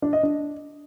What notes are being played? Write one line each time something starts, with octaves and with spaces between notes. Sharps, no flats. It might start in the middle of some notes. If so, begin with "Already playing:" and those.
D4
D#5
D4